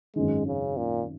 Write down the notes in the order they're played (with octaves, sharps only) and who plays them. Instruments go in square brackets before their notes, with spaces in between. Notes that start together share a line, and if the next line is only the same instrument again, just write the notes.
[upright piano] G#1 F#2 D#3 [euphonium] G#3
[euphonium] C#3
A#2